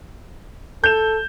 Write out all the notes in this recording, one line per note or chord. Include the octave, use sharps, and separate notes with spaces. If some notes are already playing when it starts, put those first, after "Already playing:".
A4 G6 E7